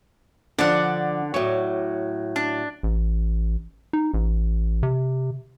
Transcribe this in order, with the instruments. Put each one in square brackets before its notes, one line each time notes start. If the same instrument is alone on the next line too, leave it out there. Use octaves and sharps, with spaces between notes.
[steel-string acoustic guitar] D3 [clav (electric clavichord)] F3 D4 [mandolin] D5 F#5
[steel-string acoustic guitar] A2 F#3 [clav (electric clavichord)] C#5
[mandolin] D4
[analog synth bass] A1
D#4
A1
C3